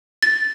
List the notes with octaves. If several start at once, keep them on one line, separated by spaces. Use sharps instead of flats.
A6